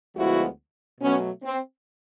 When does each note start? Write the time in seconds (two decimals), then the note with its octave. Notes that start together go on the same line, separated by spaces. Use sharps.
0.16 D2 D3 F3 G#3 B3 E4 F#4
1.01 B2 F#3 A3 B3 C#4
1.43 C4